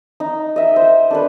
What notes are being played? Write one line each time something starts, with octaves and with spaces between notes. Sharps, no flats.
D#4
D#5 E5
C5
D4 A4 B4